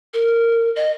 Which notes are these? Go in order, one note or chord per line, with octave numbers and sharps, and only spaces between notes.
A#4
D#5